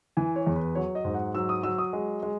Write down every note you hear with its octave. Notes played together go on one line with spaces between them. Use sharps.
E3 G#5
C#5
E2
B4
F#3 C#5
D#5
G#2
F#5
F#3 E6
D#6
F#3 E6
D#6
G#3
G#3